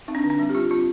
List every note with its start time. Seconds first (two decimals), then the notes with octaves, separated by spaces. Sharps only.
0.08 C4 D#4
0.15 D4
0.24 D3
0.30 D4
0.39 G3 C4
0.50 G4
0.54 G3 F4
0.70 C4 F4